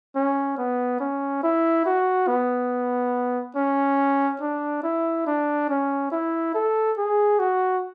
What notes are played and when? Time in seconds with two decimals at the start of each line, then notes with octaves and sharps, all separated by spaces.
0.16 C#4
0.58 B3
1.00 C#4
1.43 E4
1.86 F#4
2.28 B3
3.56 C#4
4.42 D4
4.83 E4
5.27 D4
5.69 C#4
6.12 E4
6.55 A4
6.98 G#4
7.39 F#4